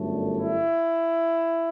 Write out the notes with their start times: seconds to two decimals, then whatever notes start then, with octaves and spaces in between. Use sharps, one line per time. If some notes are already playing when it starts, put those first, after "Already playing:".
Already playing: G1 F#2 D3 A3
0.36 E4